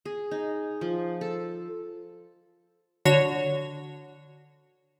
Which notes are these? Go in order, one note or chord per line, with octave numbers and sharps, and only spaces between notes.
G#4
D#4
F3
A4
D3 F#4 C#5